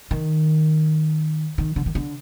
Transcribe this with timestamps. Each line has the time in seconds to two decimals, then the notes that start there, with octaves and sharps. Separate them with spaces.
0.11 D#3
1.58 D#3
1.76 D3
1.86 D#3
1.95 D3